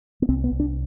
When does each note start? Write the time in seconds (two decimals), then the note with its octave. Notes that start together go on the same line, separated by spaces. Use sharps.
0.22 B3
0.29 C2 C4
0.44 B3
0.51 C2
0.60 D4